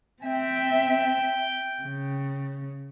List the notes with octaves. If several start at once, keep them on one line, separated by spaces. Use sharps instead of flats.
C4 E5 G5
C#3